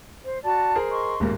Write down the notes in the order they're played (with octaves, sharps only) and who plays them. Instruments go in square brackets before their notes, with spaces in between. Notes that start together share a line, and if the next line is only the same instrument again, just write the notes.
[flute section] C5
F#4 D5 A5
[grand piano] G#4 A#4 C5
[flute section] D#5 C6 C#6
[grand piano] D#1 G#2 A#3